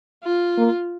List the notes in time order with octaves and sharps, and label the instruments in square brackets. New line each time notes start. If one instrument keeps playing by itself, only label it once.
[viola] F4
[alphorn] A#3